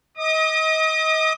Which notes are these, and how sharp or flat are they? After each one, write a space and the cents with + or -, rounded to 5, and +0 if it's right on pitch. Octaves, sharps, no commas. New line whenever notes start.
D#5 +30 D#6 -40